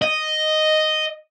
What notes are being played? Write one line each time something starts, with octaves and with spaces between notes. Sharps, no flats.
D#5